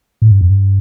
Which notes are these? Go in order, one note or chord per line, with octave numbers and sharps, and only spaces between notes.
A2
G2
F2
G2